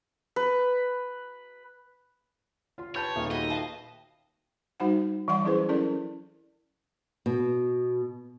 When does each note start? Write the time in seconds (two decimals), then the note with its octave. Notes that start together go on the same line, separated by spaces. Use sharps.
0.36 B4
2.78 F4 F5 C6
2.95 G4 B4 C#5 A5 G6 A6
3.16 D#1 D#2 A3 D#4 F4 G4 G#4
3.31 B2 B3 F#4 G#4 B4 D#5 E5
3.50 E5 F5 G5 A5
4.80 G3 D#4 F#4 C5 F#5
5.28 E3 G3 D5 F#5 C6 C#6
5.44 F#3 C#4 E4 G#4 B4 C5
5.69 C#4 E4 A4 A#4 D5
7.26 B2